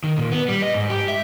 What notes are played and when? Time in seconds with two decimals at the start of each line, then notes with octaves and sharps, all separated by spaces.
0.04 D#3
0.18 A#2
0.32 B3
0.48 G3
0.62 D#5
0.74 G#2
0.90 G4
1.08 E5